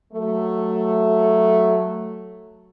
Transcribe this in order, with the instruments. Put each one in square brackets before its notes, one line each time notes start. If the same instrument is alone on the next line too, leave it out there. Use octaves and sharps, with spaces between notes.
[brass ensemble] F#3 A3